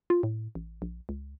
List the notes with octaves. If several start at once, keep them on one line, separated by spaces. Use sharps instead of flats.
F4
A2
A1
A#1
C#2